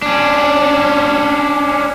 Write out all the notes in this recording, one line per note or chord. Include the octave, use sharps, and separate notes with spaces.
C#4 D4